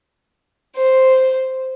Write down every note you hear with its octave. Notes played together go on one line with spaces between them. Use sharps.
C5